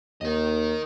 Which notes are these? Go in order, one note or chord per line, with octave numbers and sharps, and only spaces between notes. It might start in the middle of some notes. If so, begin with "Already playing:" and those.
D#2 A#4 D#5